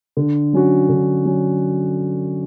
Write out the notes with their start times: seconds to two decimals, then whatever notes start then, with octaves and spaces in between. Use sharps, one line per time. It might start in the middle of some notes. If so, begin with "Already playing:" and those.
0.17 D3
0.53 F#3 C#4 F#4
0.89 D3
1.25 F#3 C#4